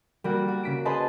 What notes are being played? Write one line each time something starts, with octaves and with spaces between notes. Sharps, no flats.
G3 A#3 F#4
F#4
C#3 B6 D7
G#4 B4 C5 D#5 A5